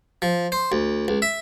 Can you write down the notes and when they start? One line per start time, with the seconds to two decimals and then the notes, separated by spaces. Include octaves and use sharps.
0.22 F3
0.52 C5
0.72 D2
1.08 C#2
1.22 E5